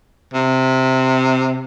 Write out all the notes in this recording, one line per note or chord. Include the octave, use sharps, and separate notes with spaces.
C3